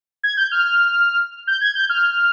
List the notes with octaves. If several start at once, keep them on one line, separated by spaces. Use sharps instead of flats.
G#6
G6
F6
G6
G#6
G6
F6